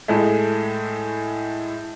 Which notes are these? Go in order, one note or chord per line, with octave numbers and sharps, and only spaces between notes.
A2 G#3 A3